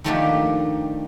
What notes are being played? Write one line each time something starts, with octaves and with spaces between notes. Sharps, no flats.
D#3 F3 A3 A#3 D4 G4